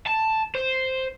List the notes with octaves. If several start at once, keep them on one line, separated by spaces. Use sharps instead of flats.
A5
C5